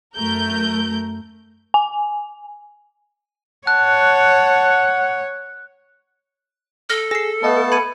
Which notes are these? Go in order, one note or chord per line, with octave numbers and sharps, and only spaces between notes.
F#2 A3 A#4 G6
G#5
C#5 F#5 A5 F#6
A4 F6 A#6
G#4 E6 A#6 C7
A3 B3 B4 D#5 F5 A5
B5 G#6 C#7 D#7